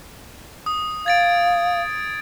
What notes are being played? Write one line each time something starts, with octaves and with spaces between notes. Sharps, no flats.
D#6
F5 G#6 A6 D7